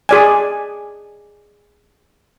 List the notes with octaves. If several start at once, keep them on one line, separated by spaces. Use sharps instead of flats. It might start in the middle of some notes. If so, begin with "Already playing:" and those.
G#4 D5 G#5